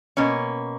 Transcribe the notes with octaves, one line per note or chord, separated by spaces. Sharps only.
B2 A#3 C#4